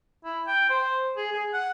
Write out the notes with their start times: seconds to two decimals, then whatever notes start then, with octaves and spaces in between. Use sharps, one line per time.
0.25 E4
0.47 G5
0.70 C5
1.17 G#4
1.32 G#4
1.53 F#5